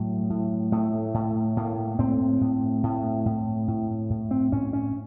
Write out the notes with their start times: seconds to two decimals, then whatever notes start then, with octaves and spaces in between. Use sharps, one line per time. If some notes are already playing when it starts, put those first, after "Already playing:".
Already playing: A2 F#3
0.30 A2
0.72 A2 A3
1.14 A2
1.57 A2 A#3
1.99 A2 C4
2.41 A2
2.83 A2
3.26 A2
3.68 A2
4.10 A2
4.31 C4
4.52 A2 C#4
4.73 C#4